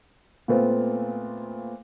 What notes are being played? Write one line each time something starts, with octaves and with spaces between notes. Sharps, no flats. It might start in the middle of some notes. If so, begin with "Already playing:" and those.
A#2 A3 B3 C4 F4